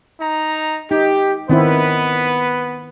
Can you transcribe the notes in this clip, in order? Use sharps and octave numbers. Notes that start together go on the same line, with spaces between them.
D#4 A#5
D#4 G4
D#3 B3 C4 E4 B4